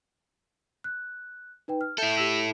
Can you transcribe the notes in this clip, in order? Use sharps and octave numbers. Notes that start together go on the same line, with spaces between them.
F#6
D#4 B4 G5
F6
E4 A4 E5 G6 G7
G4 E6 F#7